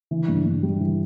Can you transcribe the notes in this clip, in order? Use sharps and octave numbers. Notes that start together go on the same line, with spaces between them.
E3
G2
G2
G3
E3